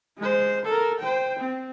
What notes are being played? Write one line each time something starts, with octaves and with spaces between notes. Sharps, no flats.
G#3 C5
A4 A#4
C5 G5
C4